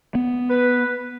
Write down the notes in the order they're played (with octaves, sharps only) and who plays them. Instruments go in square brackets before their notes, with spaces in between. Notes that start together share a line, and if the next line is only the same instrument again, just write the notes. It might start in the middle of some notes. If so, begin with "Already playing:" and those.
[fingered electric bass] B3
[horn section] B4